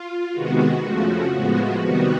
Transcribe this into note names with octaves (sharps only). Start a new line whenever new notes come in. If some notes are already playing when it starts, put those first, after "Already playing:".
Already playing: F4
C3 D#3 G#3 B3 F#4
F2 C#3 F3 A3
A2 F3 G#3 B3
C3 D#3 G3 B3 F#4